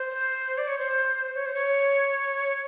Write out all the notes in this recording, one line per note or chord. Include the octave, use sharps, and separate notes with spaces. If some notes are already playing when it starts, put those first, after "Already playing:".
Already playing: C5
D5
C#5
C5
C#5
C5
C#5